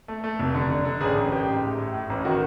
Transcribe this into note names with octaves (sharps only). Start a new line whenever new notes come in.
A3
A3
F1
D3
D3
D3
A1 G#4
A1
A1 G4
G#2
A2
A2
A2
A1
D#3 F#4